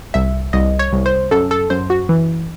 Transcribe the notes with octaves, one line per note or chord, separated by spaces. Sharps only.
C2 E5
C2 D#5
C#5
C2
C5
F#2 A4
A4
F#2 C5
F#4
E3